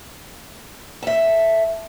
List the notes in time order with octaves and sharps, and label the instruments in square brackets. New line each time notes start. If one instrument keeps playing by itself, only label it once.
[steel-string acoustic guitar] A4 E5